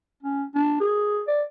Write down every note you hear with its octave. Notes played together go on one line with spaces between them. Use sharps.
C#4
D4
G#4
D5